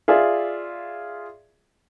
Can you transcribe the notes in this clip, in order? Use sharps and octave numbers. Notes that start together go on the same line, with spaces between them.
F4 G#4 D5 E5